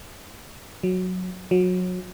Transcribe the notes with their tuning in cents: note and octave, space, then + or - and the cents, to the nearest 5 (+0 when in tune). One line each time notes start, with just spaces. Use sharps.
F#3 -10
F#3 -25